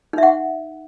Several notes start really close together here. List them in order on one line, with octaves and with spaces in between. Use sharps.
D#4 E5 F#5